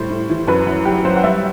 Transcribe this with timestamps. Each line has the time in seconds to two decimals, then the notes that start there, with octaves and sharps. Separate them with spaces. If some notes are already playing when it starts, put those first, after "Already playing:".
Already playing: A2 G3 C5
0.10 A2
0.29 E3
0.47 F#2 B4
0.67 F#2
0.85 F#3 G4
1.05 F#3 C5
1.16 F#5
1.23 G3 E5